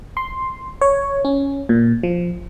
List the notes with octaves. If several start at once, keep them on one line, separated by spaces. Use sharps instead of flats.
C6
C#5
C#4
A#2
F3